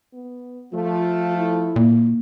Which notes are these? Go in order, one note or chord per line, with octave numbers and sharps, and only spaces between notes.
B3
F3 A3 F4
E4
A#2 A#3